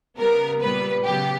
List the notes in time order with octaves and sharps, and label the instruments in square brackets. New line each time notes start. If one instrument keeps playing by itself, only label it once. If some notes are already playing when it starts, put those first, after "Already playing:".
[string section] C#3 G3 B3 A#4
A#2 G3 B3 B4
C#3 F#3 B3 G4